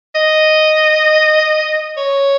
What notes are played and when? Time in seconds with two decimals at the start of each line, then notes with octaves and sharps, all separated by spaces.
0.15 D#5
1.97 C#5